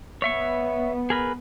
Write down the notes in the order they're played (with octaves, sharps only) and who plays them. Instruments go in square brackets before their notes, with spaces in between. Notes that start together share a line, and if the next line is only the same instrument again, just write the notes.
[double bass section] B3 [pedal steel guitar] C#5 E5 C#6
[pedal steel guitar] G#4 A#4 B4